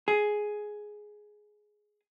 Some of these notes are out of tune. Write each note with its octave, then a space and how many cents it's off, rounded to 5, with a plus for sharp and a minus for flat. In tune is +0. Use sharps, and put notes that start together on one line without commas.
G#4 +10